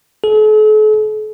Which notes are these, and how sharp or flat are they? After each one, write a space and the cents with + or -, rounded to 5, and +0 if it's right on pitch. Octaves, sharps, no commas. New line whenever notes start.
A4 -45